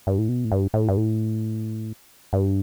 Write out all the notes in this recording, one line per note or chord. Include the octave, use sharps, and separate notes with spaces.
G2
A2
B2
A2
G2
A2
G2
A2
G2